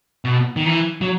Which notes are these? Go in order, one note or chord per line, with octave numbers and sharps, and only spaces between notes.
B2
D#3
E3
F#3